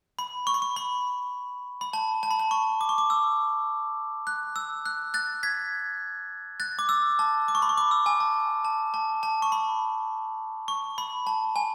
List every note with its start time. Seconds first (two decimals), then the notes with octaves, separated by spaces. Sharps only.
0.19 B5
0.47 C#6
0.54 B5
0.62 C#6
0.76 B5
1.81 B5
1.93 A5
2.23 A5
2.31 B5
2.39 A5
2.51 C#6
2.81 D6
2.89 C#6
2.98 D6
3.10 E6
4.27 F#6
4.56 E6
4.86 F#6
5.14 F#6 A6
5.43 G#6 B6
6.60 F#6 A6
6.79 D6
6.89 E6
7.19 A5
7.48 D6
7.55 C#6
7.62 B5
7.69 C#6
7.77 D6
7.91 E6
8.06 G#5
8.20 A5
8.65 A5
8.94 A5
9.23 A5
9.42 C#6
9.52 B5
10.68 C#6
10.98 B5
11.27 A5
11.56 G#5